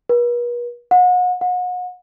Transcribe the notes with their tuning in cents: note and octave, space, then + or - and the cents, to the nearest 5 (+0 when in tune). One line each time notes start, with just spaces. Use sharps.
B4 -45
F#5 -35
F#5 -35